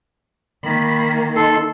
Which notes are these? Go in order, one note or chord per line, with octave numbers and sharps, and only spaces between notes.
D#3 A#3 B5
D#4 A4 C6